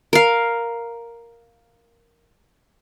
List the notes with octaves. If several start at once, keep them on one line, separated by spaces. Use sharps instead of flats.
A#4 F5